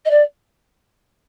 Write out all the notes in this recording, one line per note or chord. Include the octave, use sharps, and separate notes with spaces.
D#5
D5